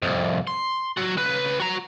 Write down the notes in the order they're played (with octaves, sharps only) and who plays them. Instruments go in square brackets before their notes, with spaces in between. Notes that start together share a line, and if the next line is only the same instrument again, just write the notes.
[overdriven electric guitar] C2 F2
C6
F#3 F#4
C#3 B4
F#4 A#5